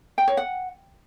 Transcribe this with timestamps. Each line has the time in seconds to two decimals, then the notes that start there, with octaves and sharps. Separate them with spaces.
0.18 G5
0.28 C#5
0.37 F#5